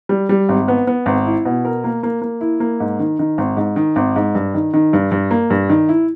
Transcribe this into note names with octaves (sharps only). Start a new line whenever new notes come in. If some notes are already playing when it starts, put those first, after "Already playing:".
G3
G3
G#1
B3
B3
G#1
E4
B2
A#4
A#3
A#3
A#3
E4
A#3
G#2
D#3
D#3
G#1
G#2
D#3
G#1
G#2
G2
D#3
D#3
G2
G2
A#3
G2
D#3
E4